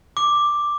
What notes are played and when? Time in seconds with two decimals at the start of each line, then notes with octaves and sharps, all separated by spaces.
0.17 D6